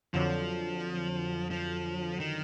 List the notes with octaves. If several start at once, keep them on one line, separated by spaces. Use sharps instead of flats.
F2 D3 F3 F#3
F3
D#3